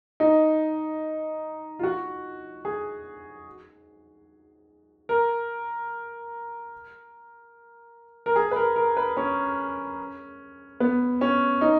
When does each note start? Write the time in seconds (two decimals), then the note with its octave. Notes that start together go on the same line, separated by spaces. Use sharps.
0.20 D#4
1.79 F4
1.83 F#4
2.65 G#4
5.09 A#4
8.26 A#4
8.36 G#4
8.51 B4
8.56 A#4
8.76 A#4
8.97 B4
9.17 C#4
10.80 B3
11.21 C#4
11.61 D#4